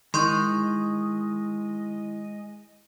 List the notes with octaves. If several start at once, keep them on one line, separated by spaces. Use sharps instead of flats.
D#3 G#3 E4 D#5 C6 C#6 G6